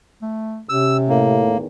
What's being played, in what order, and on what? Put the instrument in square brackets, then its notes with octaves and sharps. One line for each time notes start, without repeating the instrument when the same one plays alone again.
[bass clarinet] A3
[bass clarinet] C3 [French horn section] C#4 G4 [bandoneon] E6
[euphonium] A2 [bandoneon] A#3
[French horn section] E2 D#3